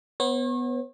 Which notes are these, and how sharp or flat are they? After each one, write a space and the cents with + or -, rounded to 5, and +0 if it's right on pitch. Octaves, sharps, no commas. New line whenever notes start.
B3 +5 C#5 -40